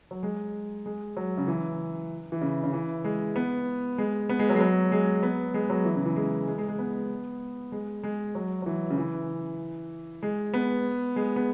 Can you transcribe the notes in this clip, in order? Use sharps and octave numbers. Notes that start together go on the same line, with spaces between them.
F#3
G#3
G#3
F#3
C#3
E3
E3
C#3
C#3
E3
G#3
B3
G#3
B3
G#3
F#3
G#3
F#3
G#3
B3
G#3
F#3
E3
C#3
E3
G#3
G#3
G#3
G#3
B3
G#3
G#3
F#3
F#3
E3
C#3
E3
G#3
B3
G#3
B3